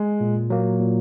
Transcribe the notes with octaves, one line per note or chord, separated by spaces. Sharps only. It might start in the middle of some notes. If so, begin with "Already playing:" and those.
Already playing: G#3
A#2
F#3 A#3
A#2